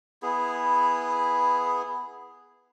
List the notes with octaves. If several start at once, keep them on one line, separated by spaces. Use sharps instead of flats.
B3 E4 G#4